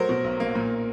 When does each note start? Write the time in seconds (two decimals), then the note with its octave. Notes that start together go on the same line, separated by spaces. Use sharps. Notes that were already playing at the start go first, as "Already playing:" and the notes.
Already playing: F#3 A3 A#4 C5
0.09 B2
0.24 B1
0.40 A#3
0.55 A#2